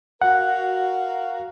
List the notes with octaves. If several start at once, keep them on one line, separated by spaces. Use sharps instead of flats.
F#4 A#4 F5 F#5